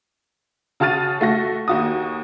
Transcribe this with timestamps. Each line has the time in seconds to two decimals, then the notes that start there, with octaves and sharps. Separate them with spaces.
0.80 C#3 F#4 A5 F6 A6 D#7
1.21 A3 F#4 A#6
1.68 D#2 F#4 D#6